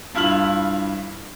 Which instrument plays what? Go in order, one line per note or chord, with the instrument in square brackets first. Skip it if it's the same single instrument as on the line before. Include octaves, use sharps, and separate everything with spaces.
[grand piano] G2 E4 F4 F6 F#7